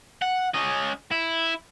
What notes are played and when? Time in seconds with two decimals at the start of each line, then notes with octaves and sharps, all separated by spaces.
0.22 F#5
0.54 C#4 D#5
1.11 E4